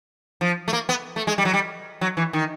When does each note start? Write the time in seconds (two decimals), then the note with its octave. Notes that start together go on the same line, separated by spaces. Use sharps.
0.41 F3
0.68 A3
0.73 A#3
0.89 B3
1.16 A3
1.27 G#3
1.38 G3
1.45 F#3
1.53 G3
2.01 F#3
2.17 E3
2.33 D#3